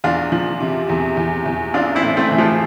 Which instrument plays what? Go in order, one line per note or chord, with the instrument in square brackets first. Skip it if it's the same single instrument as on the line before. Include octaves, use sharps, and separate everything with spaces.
[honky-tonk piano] E2 [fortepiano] D4 F4
[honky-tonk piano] F3
C3
E2
E2
E2
[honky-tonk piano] A1 [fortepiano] D4 F4
[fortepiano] C4 E4
[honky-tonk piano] A2
[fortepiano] A3 C4
[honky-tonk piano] E3
[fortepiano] F3 A3